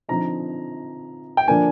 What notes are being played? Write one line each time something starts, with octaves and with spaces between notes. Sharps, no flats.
D3 F3 C4 D#4 A#5
G5
D3 F3 A#3 D4 G#5